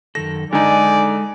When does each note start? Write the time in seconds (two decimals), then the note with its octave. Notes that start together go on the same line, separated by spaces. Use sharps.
0.15 F#2 D#3 A4 A#6
0.53 D3 G#3 D#4 A4 D5 G#5